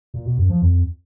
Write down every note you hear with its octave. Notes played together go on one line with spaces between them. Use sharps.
A#2
B2
F#2
F3
F2